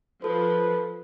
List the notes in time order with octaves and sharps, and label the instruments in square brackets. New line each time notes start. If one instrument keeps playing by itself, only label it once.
[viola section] F3 [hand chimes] A4 [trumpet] B4